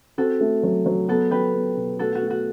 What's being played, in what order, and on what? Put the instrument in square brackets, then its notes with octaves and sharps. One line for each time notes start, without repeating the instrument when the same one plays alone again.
[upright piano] C4 [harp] F#4 A4
[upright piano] A3
F#3
F#3
[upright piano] B3 [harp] F#4 A4
[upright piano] F#3 [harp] G4 B4
[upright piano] B3
B2
[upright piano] A3 [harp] F#4 A4
[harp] F#4
[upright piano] A3
[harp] F#4